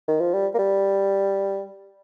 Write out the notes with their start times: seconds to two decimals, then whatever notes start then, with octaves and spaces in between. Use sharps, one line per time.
0.08 D#3
0.20 F3
0.34 G3
0.54 A#3
0.59 G3